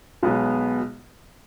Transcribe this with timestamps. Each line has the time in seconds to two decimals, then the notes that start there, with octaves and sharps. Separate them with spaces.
0.23 B1 B2 G#3 B3